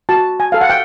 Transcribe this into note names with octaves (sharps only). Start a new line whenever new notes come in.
F#4 A5
G#5
A4 F5
F#5
G5